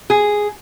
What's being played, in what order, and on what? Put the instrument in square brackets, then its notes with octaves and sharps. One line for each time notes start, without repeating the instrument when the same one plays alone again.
[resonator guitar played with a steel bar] G#4